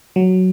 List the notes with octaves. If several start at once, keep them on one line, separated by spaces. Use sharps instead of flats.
F#3